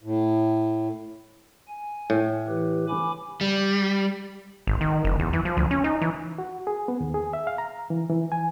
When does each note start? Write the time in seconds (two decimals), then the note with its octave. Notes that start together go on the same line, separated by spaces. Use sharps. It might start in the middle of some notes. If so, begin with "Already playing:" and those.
0.03 A2
1.68 G#5
2.10 A2
2.48 E3 G4 B4
2.89 G#5 B5 D6
3.41 G3
4.67 G#1
4.81 D#3
5.05 F#1
5.19 E2
5.33 E3
5.45 F3
5.57 D2
5.71 C#4
5.84 D#4
6.02 E3
6.38 F#4
6.67 G#4
6.88 B3
7.01 D#2
7.14 G#4
7.33 E5
7.47 F5
7.58 A#5
7.90 E3
8.10 E3
8.32 G#5